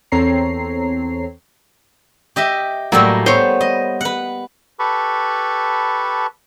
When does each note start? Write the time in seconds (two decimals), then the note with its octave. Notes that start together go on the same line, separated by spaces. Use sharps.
0.12 E2 C4 A4 C#5 A#5 C7
2.36 G4 D#5 E5
2.92 A2 F#3 G3 A#3
3.26 B3 C5 C#5
3.61 D#5
4.01 B4 F#5
4.79 G4 A4 B4 A5 B5 C#6